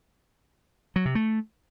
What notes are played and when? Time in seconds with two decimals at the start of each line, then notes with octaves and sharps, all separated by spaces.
0.96 F#3
1.05 C3
1.15 A3